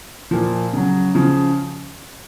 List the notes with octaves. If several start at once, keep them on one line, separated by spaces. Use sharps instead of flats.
A#2 F3
C#3 F#3
C#3 F3